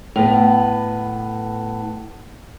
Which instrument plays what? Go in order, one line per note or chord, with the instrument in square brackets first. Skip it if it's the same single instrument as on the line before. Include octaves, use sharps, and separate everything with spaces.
[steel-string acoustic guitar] A2 B3